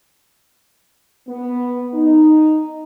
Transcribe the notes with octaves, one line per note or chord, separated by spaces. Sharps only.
B3
D#4